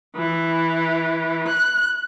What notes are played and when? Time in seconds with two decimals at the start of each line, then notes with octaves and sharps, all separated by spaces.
0.17 E3
1.48 F#6